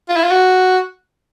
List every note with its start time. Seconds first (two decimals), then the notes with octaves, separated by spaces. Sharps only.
0.09 F4
0.16 E4
0.24 F4
0.31 F#4